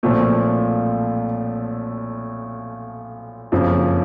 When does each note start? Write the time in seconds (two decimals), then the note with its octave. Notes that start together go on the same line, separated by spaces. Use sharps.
0.03 B1 A#2 F3 A3 C4
3.52 F#1 F2 C#3 F3